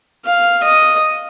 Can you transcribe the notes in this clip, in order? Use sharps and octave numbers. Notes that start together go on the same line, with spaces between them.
F5
D#5